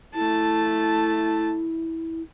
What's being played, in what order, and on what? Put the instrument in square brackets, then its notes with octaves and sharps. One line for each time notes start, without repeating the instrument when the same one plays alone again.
[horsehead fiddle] A3 A5 [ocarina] E4